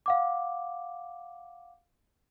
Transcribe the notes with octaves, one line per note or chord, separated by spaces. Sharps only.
F5 F#5 D6